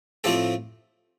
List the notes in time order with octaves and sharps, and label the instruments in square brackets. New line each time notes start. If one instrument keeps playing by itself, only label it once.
[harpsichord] A2 F3 A3 C4 G4 A4